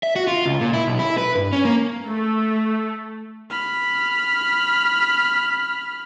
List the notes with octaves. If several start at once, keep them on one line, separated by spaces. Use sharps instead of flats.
E5
F#4
F4
C#2
A#2
E4
B1
E4
B4
G2
C#4
A#3
A3
B5 F6